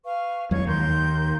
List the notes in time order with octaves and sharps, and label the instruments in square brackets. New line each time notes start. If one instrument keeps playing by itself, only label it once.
[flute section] B4 F5 C#6
[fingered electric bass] E2 F#3 G#3 [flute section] C#5 C#6 G#6
[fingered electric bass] D#2 [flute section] A#4 C6 G6